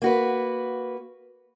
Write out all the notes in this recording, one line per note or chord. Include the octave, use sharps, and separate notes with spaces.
A#3 F#4 B4